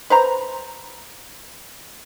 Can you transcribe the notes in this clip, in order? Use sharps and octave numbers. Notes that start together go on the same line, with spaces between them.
B4 C5 A#5